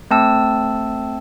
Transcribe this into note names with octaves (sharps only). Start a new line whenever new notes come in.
A3 C4 A5 E6